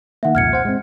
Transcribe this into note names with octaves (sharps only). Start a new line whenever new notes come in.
D#3 A#3 E5 F#5
C2 F2 A#2 F6 G#6 C#7
C5 F#5
G#3 C4